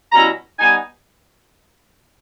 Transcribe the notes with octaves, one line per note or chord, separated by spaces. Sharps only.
B2 G3 C#4 E4 A#5
G3 B3 D#4 G#5